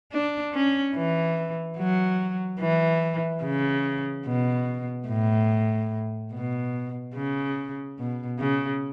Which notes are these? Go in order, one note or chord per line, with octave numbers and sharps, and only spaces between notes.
D4
C#4
E3
F#3
E3
C#3
B2
A2
B2
C#3
B2
C#3